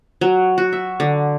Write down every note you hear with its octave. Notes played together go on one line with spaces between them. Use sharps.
F#3
F#4
E5
D3